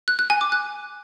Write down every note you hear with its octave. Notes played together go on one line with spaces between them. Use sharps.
F#6
F#6
G#5
D6
F#6